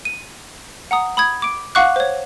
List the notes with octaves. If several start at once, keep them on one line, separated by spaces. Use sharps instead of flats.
D#7
F#5 A#5 D#6
B5 D#6 G#6
D6 D7
F5 F#5 C#6 D6 F#6
C5 C#5